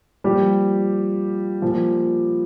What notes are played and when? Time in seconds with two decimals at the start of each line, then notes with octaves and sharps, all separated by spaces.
0.24 A#2 F3 G3 G4
1.62 A#2 F3